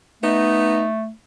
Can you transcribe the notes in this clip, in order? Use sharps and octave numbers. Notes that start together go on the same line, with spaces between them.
A3 B3 D#4